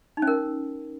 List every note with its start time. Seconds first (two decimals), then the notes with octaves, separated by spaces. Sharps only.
0.17 D#4
0.22 C#4
0.27 A#4